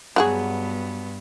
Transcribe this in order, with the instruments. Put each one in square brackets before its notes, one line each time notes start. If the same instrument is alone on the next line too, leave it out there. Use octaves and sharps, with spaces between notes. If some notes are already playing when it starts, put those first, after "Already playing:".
[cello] G2 B3 [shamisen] F#3 F#4 G#4